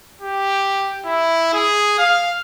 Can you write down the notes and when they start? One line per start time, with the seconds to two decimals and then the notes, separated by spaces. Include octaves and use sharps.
0.22 G4
1.05 E4
1.54 G#4
1.99 F5